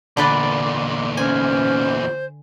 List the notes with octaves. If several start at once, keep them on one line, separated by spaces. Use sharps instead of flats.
E2 A#2 D3 B4 D5
C#4 C5 G#5